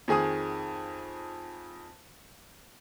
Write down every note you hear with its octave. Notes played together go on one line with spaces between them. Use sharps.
F2 D#3 G#4 G#5 D#6